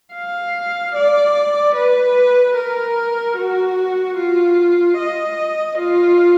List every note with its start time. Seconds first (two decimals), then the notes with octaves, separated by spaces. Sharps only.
0.15 F5
0.95 D5
1.75 B4
2.56 A#4
3.37 F#4
4.17 F4
4.97 D#5
5.78 F4